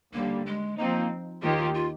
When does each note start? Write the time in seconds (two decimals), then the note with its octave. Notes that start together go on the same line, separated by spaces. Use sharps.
0.13 D#2 D3 G3 A#3
0.46 G#3
0.78 F3 A#3 C4 D#4
1.42 D#2 D#3 A#3 D#4 F4 G4
1.58 F4
1.74 F4